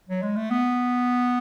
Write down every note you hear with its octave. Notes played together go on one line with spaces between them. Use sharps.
F#3
G#3
A3
B3